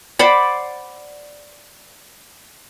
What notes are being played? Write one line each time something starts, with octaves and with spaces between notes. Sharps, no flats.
C5 D5 F#5 B5